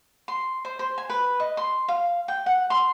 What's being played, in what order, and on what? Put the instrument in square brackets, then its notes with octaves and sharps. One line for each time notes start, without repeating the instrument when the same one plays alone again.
[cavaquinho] C6
C5
C5
G#5
B4
D#5
C6
F5
G5
F#5
C6